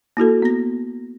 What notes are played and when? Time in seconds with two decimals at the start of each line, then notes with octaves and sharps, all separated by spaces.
0.17 A#3 E4 F#4 A4
0.42 B3 A#6